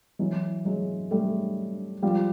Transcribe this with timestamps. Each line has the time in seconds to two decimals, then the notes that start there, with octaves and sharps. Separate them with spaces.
0.19 E3 F#3
0.65 F#3 G#3
1.11 G3 A3
2.03 F3 G3